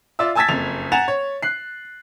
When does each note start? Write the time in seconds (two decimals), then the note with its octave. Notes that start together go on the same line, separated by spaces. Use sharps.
0.19 F4 D5 E5 E6
0.35 G#5 A5 E6 G#6 A6 B6
0.48 F#1 F2 F7
0.92 F#5 G#5 A#5 A6 E7 F7
1.08 C#5
1.43 F#6 C7